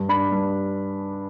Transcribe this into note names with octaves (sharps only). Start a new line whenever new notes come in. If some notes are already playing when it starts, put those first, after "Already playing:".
Already playing: G2
D4 B5
G2